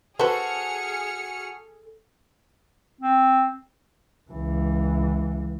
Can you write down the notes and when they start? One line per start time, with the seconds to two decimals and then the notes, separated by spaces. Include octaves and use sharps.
0.19 F#4 G#4 A4 B4 C5 F6 C#7
3.01 C4
4.31 C#2 E3